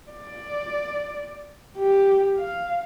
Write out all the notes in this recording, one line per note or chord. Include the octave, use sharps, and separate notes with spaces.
D5
G4
F5